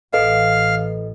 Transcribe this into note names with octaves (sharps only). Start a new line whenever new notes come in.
A1 A4 B4 D#5 F5